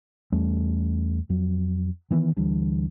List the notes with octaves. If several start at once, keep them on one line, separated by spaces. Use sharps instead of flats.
E2 G3 A3 C#4
F2 F#3
D#3 E3 B3
D2 E3 G3 D4